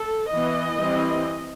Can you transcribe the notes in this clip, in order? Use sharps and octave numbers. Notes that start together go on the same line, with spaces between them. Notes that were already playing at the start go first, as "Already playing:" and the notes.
Already playing: A4
E3 B3 D#5
E3 G3 C4